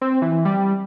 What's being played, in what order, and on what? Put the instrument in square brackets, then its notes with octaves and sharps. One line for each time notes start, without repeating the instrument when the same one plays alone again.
[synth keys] C4
E3
G3